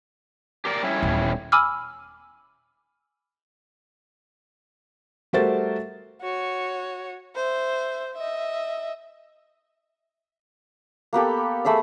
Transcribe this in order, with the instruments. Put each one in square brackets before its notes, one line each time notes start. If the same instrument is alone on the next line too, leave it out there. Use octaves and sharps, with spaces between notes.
[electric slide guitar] G4 A#4 D5
G3 C#4 E4
[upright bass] D#1 B3
[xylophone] G#5 B5 D6 E6 F6
[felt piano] G3 A3 F#4 A#4 C5 A6
[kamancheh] F#4 C#5
C5 E5
D#5 E5
[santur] A#3 B3 G4 A4
A3 G#4 B5 E6